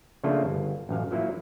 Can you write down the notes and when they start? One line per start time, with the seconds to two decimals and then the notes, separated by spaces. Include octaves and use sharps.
0.24 C#3 F3 A3 A#3 D4 F4
0.44 G1
0.89 A1 F#2 F5
1.11 F3 F#3 A#3 E4